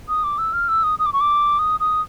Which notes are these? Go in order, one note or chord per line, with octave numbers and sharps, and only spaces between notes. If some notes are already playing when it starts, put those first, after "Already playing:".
D#6
D6
E6
F6
E6
D#6
D#6
D6
C#6
D6
D#6
D#6